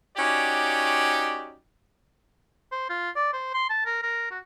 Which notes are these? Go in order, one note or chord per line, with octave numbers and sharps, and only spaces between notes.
C#4 D#4 F#4 G4 D5
C5
F4
D5
C5
C6
A5
A#4
A#4
F#4